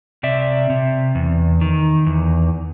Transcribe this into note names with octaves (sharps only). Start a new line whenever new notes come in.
C3 D5 E5
C3
E2
D#3
E2